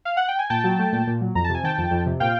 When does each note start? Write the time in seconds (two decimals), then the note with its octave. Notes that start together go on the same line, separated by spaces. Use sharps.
0.05 F5
0.17 F#5
0.28 G5
0.39 G#5
0.50 A#2 G5 A5
0.64 F#3
0.79 A3
0.93 A#2
1.07 A#2
1.21 F#3
1.35 F2 A#5
1.44 A5
1.49 C3
1.55 G#5
1.63 D#3 G5 A5
1.78 F2
1.91 F2
2.06 C3
2.20 A#2 F5 G5